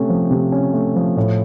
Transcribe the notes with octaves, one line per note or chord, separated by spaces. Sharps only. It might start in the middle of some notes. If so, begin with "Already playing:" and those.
Already playing: C3 A3 C#4
F3
C3
C#4
A3
F3
A2